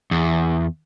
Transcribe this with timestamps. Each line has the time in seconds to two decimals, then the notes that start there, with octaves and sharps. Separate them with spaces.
0.11 E2